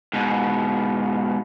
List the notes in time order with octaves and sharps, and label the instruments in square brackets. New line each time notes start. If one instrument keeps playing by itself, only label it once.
[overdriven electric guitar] G#2 B2